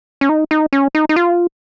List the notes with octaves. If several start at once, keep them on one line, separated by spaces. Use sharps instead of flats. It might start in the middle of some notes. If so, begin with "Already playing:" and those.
C#4
D#4
D#4
C#4
D#4
D#4
F4